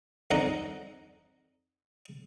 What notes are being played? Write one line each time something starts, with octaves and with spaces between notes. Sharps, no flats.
F2 D4 D#4 A4 F#5 A#5